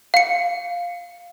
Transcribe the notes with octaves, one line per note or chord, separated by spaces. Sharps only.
F5 C#7